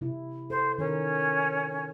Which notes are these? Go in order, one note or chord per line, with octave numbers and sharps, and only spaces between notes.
C3 E4
A4 C5
D#3 C#4 A#4